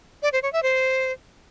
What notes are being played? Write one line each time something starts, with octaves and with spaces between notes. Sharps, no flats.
D5
C5
C#5
E5
C5